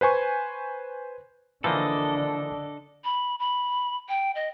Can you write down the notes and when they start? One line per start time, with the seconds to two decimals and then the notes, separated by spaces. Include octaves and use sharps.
0.01 B4 C5 G#5 C#6
1.64 D3 E3 F3 A#3 D4 A4 D#5
3.05 B5
3.40 B5
4.09 G5
4.35 D#5